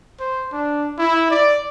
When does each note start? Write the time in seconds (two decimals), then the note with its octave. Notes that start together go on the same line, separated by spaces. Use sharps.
0.20 C5
0.53 D4
0.98 E4
1.30 D5